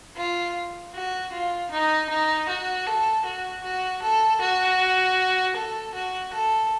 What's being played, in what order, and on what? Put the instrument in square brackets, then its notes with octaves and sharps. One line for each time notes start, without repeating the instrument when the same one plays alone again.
[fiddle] F4
F#4
F4
D#4
D#4
F#4
A4
F#4
F#4
A4
F#4
A4
F#4
A4